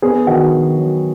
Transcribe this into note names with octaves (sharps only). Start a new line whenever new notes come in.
B3 G#4
D#3 F#4
D#3
F#3